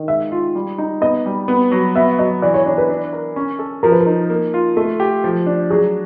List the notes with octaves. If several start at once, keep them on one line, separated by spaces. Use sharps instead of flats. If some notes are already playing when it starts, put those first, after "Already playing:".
Already playing: D#3
G#3 E5
F4
G3
D#4
B3 D#5
G3
B3
F#3
B3 E5
F#3 D#5
E3 D5
C#5
D4 C#5
B4
D4
A#4
C#4
A4
F3 A#4
B4
A#4
D#4
A#3
F4
A3 A4
G4
F3
D4
F#3 G#4